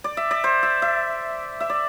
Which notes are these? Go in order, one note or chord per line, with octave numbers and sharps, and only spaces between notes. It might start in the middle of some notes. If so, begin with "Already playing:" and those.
D5
E5
D5
C5
E5
E5
E5
D5